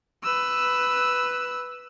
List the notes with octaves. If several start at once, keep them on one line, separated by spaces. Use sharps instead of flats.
B4 E6